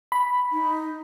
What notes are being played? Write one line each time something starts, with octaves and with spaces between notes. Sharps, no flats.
B5
D#4